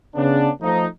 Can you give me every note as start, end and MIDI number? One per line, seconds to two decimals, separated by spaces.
0.15 0.49 49
0.15 0.49 59
0.15 0.49 62
0.62 0.85 53
0.62 0.85 57
0.62 0.85 63